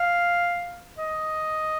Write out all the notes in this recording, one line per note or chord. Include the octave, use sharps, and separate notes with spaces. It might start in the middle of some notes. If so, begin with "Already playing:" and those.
Already playing: F5
D#5